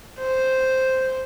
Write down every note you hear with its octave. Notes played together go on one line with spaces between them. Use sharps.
C5